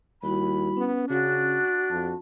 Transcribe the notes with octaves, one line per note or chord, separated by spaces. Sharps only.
D#2 G3 E4 F#4 B5
B3 C#4
C#3 D4 F#4
F2 A5